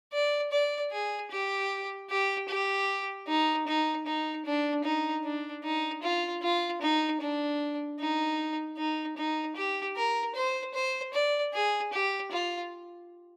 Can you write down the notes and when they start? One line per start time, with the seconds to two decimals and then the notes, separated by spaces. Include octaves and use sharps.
0.13 D5
0.52 D5
0.92 G#4
1.31 G4
2.10 G4
2.49 G4
3.28 D#4
3.67 D#4
4.07 D#4
4.46 D4
4.84 D#4
5.24 D4
5.64 D#4
6.03 F4
6.42 F4
6.82 D#4
7.21 D4
7.99 D#4
8.78 D#4
9.17 D#4
9.56 G4
9.96 A#4
10.36 C5
10.74 C5
11.13 D5
11.54 G#4
11.93 G4
12.32 F4